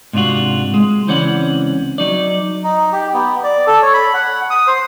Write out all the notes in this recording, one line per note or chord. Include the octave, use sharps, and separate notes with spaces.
G#2 C3 D4 F4 F#4
G#3
C#2 E3 C4 C#4 D5 F#5
F#3 D#4 D5
D#4
G4
B3
D5
A4
C#5
B5
F#5
D#6
C5